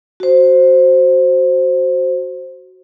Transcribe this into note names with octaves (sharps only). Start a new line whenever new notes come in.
F#4 C5